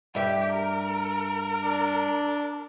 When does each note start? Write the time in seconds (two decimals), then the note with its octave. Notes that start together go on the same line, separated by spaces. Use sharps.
0.15 G2 G4 E5
0.52 A#4
1.64 D4